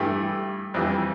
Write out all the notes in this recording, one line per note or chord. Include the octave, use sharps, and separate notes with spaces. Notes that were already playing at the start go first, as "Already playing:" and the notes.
Already playing: G2 E3 A3 E4 G4
F2 E3 G3